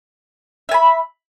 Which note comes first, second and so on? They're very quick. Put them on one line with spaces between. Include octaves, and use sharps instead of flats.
E5 G#5 B5